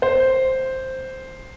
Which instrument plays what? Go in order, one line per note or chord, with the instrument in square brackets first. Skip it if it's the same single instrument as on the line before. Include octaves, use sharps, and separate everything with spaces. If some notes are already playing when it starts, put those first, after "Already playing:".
[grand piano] C5